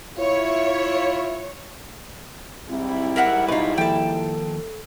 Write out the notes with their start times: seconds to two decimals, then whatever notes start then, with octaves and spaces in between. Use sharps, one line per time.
0.18 E4 F4 C#5
2.69 G#2 G3 C4 E4
3.16 A#4 E5 F#5
3.49 B2 D#4 F4 B4 D#5
3.78 D#2 F3 A4 G5 A5